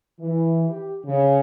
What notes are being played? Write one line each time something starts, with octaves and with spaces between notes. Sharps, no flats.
E3
G4
C#3